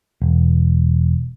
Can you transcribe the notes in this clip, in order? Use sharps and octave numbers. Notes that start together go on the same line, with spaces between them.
E1